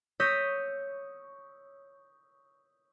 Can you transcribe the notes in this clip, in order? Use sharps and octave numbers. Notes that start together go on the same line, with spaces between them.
C#5 D#6 E6 G6 A#6 B6